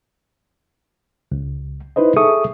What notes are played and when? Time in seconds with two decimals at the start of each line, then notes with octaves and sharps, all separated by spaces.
1.32 C#2
1.96 D#4 E4 B4 C5 D#5
2.16 G#4 A4 E5 C#6 D#6